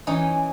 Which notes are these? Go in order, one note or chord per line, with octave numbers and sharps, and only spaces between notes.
E3 C#4 D#4